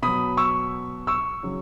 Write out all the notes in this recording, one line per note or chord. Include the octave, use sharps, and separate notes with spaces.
B2 F#3 B5 D#6
C#6 E6
C#6 E6
C#3 F#3